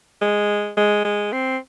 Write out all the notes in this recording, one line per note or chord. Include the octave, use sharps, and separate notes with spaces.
G#3
G#3
G#3
C4